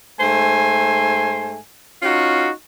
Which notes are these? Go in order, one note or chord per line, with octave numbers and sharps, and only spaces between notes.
G#2 A3 C5 G#5
C#4 D#4 F4 F#4